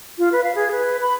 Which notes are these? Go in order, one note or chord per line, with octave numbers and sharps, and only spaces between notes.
F4
B4
F5
G#4
B4
B5